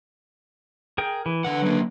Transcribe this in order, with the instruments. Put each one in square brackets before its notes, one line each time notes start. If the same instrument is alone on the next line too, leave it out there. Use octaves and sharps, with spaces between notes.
[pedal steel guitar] G#4 A#4 G5
E3
[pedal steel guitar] D3 B4 [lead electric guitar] E3 F#5
[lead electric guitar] F#3 A#3